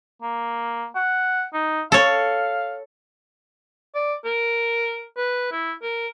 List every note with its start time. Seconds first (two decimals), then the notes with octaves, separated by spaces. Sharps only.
0.22 A#3
0.96 F#5
1.54 D#4
1.92 A4 C#5 F5
3.95 D5
4.25 A#4
5.17 B4
5.52 E4
5.83 A#4